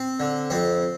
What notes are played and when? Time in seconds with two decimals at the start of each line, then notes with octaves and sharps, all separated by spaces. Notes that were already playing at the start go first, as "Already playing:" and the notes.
Already playing: C4
0.20 D3
0.50 F2 C4